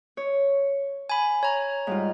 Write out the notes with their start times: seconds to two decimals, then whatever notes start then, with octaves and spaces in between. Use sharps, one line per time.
0.17 C#5
1.10 G#5 B5
1.43 C#5 A#5
1.87 G#2 G3 F4